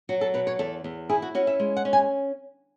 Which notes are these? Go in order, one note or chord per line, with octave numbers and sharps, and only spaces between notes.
F#3 F#4
A4
B2 B4
C#5
E2 A4
E2
E4 G#4
F#4
C#4 F#4
E5
G#3
F#5
C#4
G#5